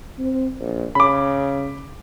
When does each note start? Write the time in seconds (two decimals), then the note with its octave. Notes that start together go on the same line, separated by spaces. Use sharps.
0.18 C4
0.60 A#1
0.95 C#3 B5 D6